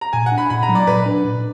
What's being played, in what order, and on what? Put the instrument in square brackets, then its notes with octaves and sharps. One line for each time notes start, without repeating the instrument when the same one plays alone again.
[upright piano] A#5
[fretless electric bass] A#2 [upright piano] G#5
[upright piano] F#5
[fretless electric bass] D4
[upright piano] B5
[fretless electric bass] A#2 [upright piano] B5
[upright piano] A#5
[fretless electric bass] F#3
[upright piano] D5
[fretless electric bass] A#2 [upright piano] B4
[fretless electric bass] D4
A#2